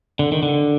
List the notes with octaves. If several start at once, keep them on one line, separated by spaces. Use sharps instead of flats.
D3
D#3
D3